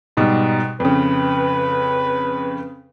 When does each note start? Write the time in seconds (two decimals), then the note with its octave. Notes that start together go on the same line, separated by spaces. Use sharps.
0.17 G#2 B2 G3
0.80 F2 C#3 B4